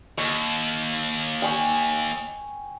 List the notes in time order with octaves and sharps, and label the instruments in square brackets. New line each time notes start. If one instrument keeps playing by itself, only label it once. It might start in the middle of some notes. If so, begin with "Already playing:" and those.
[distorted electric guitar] D#2 [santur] C#6
[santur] G5 G#5 C#6